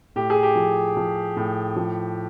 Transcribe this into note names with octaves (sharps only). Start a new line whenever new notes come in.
A2 G4
G#4
G4
F3
F3
A2
F3